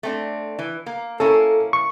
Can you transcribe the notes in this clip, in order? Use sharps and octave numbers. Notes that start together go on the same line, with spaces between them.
A3 C4 D4
E3
A#3
A#3 C#4 E4 A4
C#6